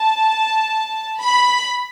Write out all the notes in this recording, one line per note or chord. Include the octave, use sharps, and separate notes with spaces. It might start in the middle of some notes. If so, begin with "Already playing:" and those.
Already playing: A5
B5